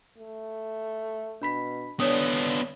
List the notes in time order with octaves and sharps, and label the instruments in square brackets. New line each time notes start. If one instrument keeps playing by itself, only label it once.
[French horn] A3
[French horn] B2 [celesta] D4 B5 B6
[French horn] D3 [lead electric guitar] B3 D4 [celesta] C#5 D#6